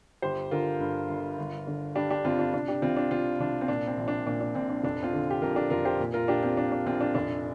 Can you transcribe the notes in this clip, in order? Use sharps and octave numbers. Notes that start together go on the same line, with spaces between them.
G1 G4 C5
D3 F4 A#4
G2
G1
G1
D3
G2 D4 G4
D4 G4
G1 C4 F4
D4
C3 D4
D4 G4
C2 C4 F4
D4
C3 C4 F4
C2 D4
C4
A#2 D4
C4
A#1
D4
A#2 D4
D4
A#1 C4
D4
F1 D4
C4 F4
D3
G4
F2 F4 A#4
D4 G4
F1 F4 A#4
G4 C5
A#2
F4 A#4
A#1 D4 G4
C4 F4
A#2 D4
D4
A#1 C4 F4
D4
F1 D4